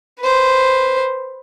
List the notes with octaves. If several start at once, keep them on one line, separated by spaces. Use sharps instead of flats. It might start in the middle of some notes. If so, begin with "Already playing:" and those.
B4 C5